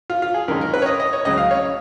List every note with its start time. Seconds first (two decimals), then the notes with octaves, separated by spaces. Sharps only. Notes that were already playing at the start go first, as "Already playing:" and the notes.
0.10 F4
0.22 F4
0.34 G#4
0.48 F#2 D#3 G#3 C#4 A#4
0.61 A#4
0.74 B4
0.82 C#5
0.86 D#5
1.00 D#5
1.13 C#5
1.25 C#2 C#3 F#3 D#5
1.38 F5
1.51 C#5